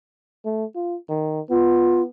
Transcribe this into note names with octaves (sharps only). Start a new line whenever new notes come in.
A3
F4
D#3
B3 F4